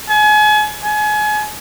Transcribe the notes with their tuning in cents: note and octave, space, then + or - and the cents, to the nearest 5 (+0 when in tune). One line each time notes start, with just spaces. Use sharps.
G#5 +35
G#5 +30